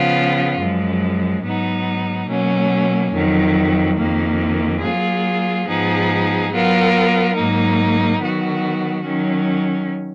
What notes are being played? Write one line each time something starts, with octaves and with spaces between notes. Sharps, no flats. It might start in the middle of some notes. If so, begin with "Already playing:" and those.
Already playing: C#3 F3 B3 F4
F#2 F3 G#3
G#2 F#3 B3 D#4
B2 F#3 A#3 C#4
F2 D#3 F#3
F2 D#3 A#3
F#3 A#3 F4 G#4
G#2 F3 B3 D#4 G#4
F#3 B3 F4 A#4
G#2 F#3 A#3 D#4
D#3 F#3 B3 F#4
D#3 F#3 C#4